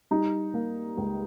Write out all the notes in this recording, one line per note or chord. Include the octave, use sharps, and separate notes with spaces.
G3 D#4
A#3
C#2